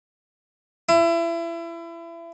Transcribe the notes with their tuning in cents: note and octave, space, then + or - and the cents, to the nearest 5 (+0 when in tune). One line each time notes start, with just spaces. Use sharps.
E4 +30